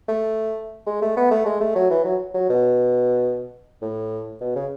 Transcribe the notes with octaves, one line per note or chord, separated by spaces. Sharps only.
A3
G#3
A3
B3
A3
G#3
A3
F#3
E3
F#3
F#3
B2
A2
B2
C#3